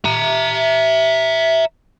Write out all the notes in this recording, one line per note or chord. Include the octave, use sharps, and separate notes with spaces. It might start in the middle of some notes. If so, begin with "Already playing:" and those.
E5 A#5